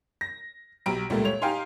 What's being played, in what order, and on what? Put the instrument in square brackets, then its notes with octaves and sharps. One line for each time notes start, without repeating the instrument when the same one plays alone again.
[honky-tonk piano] A#6
B1 G4 A#5 D7
C#2 A#2 G3 A3
C#5 F7
D#4 G4 F5 G5 G#5 C6